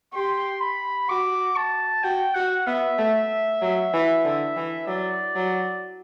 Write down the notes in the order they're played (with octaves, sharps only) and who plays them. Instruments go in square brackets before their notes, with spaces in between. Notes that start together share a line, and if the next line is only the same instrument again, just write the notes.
[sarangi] G4 [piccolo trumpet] C6
[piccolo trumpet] B5
[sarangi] F#4 [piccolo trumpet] D6
[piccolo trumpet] A5
[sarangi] F#4 [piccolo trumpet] G5
[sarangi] F#4 [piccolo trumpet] F#5
[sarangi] B3 [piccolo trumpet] E5
[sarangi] A3
F#3
E3
D3
E3
[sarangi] F#3 [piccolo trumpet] D5
[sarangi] F#3